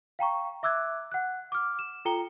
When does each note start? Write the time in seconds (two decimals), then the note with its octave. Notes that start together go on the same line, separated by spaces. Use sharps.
0.19 F5 G5 A#5 C#6
0.63 E5 D6 E6 F#6 G#6
1.12 F#5 F#6
1.52 D6 F6
1.79 E7
2.05 F4 A4 G5 A#5 C#7 G7